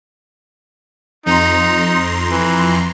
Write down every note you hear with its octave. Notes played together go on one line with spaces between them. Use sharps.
F2 D#4 A#5 C6
E3